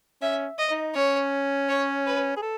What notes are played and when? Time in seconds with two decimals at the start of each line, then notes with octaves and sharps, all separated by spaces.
0.22 C#4 E5
0.58 D#5
0.71 D#4
0.95 C#4 C#5
1.69 C#5
2.06 B4
2.37 G#4
2.42 A4